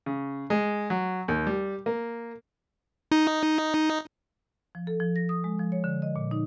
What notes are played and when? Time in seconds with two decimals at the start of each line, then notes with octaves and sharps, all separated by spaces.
0.06 C#3
0.50 G#3
0.90 F#3
1.28 D#2
1.47 G3
1.86 A#3
3.12 D#4
4.75 F3
4.87 A4
5.00 F3
5.16 A#6
5.29 D#6
5.44 G#3
5.59 F3
5.72 C#5
5.84 D3
6.02 D#5
6.16 A#2
6.31 D#4